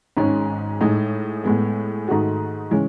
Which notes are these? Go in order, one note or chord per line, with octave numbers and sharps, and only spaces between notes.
G#1 G#2 D#3 G#3 C#4
A2 G#3 D#4
A2 G#3 B3
G#2 D#3 A3 D#4 F#4
C#3 E3 G#3 C#4